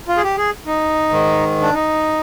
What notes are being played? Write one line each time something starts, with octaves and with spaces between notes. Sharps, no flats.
F4
G#4
G4
G#4
D#4
G#2 D#3
D4
D#4